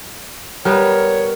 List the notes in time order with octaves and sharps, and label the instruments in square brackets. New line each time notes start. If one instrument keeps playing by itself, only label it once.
[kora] G3 B3 G4 [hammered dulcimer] A#4 [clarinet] C#5